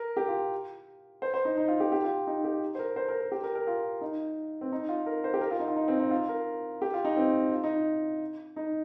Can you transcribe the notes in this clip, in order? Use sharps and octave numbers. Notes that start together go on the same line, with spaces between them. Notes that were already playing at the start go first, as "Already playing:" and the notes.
Already playing: A#4
G4
F4
C5
C5
D#4
D#4
F4
G4
G4
F4
D#4
G4
C5
A#4
C5
A#4
A#4
G4
A#4
A#4
F4
D#4
C4
D#4
F4
A#4
C5
G4
A#4
F4
D#4
F4
D#4
C4
D#4
F4
A#4
G4
F4
D#4
C4
F4
D#4
D#4